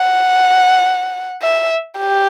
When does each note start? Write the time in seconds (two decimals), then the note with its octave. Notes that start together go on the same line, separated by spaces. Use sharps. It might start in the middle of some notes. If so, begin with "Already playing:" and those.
Already playing: F#5
1.42 E5
1.99 G4